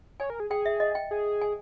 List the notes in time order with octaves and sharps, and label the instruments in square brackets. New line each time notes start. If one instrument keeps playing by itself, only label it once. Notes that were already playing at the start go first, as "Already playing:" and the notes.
[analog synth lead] C#5 [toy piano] G#5
[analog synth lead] A#4
G#4
[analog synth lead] G#4 [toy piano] G5
[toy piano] E5
D#5
G5
[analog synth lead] G#4
[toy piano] G#5